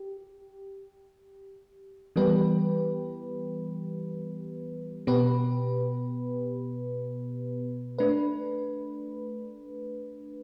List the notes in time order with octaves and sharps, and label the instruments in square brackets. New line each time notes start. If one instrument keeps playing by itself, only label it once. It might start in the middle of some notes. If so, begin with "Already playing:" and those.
Already playing: [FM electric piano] G4
E3 G3 B3 G4 B4
B2 B3 G4 B4
A3 D4 B4